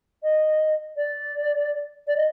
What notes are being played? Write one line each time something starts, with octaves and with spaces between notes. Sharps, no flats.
D#5
D5
D5
D#5